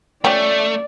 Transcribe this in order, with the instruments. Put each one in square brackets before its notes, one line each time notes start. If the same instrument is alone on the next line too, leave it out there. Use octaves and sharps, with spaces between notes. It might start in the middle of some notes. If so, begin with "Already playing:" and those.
[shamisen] F3 C#4 G4 [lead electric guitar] A3 [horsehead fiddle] D5